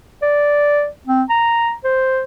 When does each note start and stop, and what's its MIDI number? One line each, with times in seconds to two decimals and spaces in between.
0.22 0.87 74
1.07 1.23 60
1.29 1.73 82
1.84 2.23 72